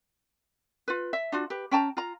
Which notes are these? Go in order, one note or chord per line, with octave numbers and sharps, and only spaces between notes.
F4 B4
E5
D4 F4 F#4
G4 B4
C#4 G5 A5 A#5
F4 A#5